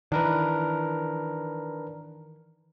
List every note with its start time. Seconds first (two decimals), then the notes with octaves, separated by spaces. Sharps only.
0.12 D#3 E3 D4 A#4 B4